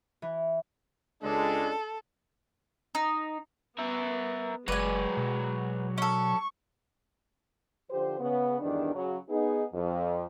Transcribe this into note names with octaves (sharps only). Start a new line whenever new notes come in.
E3
C#2 G#3 D4 A4
D#4
B3 A#4 E5
F#1 F#3 G#3 B4 D5 G#5
B2
C#4 A4 C#6
D3 F3 G4 C5
C#3 B3
E2 G2 D#3 D4
C#3 F#3
B3 D#4 G#4
F2